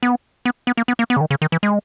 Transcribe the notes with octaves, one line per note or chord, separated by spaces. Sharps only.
B3
B3
B3
A#3
B3
A#3
B3
C#3
D#3
C#3
D#3
E3
G#3